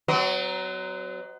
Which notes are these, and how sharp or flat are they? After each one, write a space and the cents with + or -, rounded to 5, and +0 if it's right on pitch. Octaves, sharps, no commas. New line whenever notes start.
F#3 +20 C4 -35 D#5 +0